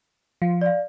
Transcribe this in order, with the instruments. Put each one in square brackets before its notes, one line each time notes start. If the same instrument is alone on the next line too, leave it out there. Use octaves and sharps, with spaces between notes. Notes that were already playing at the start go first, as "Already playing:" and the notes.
[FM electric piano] F3 [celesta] F5
[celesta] D5 F5